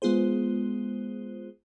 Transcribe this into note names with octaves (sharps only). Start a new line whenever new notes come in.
G#3 B3 F4 G#4 C5